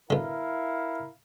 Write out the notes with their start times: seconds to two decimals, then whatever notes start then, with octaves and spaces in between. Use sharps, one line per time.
0.10 B2 D3 E4 A#4 F5